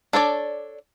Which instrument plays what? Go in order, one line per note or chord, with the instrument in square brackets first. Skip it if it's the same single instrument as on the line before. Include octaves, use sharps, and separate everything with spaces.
[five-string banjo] D4 A4 C#5 D5